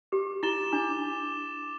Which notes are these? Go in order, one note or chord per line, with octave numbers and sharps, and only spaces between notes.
G4 D6
E4 A6 E7 G7
D4 D6